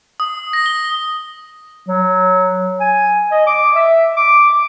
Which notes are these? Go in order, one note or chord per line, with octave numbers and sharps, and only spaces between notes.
D#6
A#6
G7
F#3
G#5
D#5
D6
E5
D6